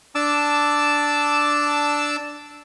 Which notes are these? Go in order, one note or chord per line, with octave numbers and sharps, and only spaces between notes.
D4 A5 D6 E6